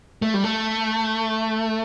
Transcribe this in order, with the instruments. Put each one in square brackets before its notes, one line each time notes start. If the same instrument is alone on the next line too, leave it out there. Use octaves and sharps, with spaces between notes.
[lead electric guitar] A3
G3
A3